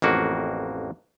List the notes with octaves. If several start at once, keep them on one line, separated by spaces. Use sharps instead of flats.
A1 F2 A#3 F#4